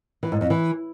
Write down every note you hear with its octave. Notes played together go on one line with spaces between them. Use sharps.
E3
G#2
F2
E3